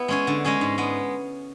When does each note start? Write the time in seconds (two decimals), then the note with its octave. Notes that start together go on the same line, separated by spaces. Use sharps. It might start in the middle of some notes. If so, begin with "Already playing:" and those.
Already playing: B3 E4
0.08 G#3 C#4 G#4
0.27 D3
0.45 G#3 C#4 G#4
0.61 G#2
0.78 G#3 B3